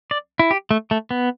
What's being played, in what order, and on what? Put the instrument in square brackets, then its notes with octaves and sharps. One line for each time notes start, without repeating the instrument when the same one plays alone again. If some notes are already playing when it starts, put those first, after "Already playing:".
[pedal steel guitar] D5
E4
G4
A3
A3
B3